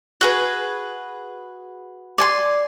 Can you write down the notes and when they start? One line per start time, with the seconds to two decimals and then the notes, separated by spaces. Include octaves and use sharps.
0.21 F#4 G#4 B4
2.18 D5 G#5 C6